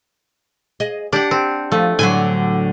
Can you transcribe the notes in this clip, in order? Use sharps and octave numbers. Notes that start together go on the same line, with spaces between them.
G#4 D#5
D4 G4 F#5
C4
F3 A3
A2 D3 F#3 G#5